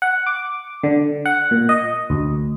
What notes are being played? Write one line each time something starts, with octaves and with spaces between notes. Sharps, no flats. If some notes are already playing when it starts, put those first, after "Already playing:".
F#5
D6
D3
F#5
A#2
D#5
D2